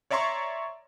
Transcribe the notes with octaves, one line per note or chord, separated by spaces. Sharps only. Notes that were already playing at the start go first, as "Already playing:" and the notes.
C#5 D5 E5 A#5 C6 C#6